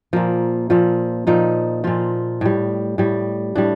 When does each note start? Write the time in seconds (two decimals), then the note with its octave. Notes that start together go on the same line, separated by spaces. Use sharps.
0.13 A#2 F3 A#3
0.70 A#2 F3
1.27 A#2 F3 D#4
1.84 A#2 F3 F4
2.41 A2 G3
2.98 A2 G3
3.55 A2 G3 D4